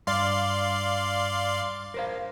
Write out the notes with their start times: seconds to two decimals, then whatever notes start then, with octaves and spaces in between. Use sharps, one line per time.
0.07 G2 D5 F5 C6
1.94 A#4 C5 F5